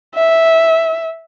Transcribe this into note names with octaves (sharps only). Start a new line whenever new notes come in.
E5